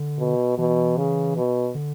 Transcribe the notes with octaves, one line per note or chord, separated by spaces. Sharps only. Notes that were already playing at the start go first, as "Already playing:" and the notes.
Already playing: D3
B2
B2 E3
C#3
B2
D3